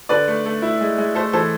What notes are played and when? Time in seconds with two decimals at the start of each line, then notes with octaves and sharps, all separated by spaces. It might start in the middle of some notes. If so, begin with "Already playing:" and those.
0.09 D3 B4 D5
0.28 A3
0.46 A3
0.62 E4
0.81 G#3
0.98 G#3
1.15 A3 A4 C5
1.33 E3 A4 C5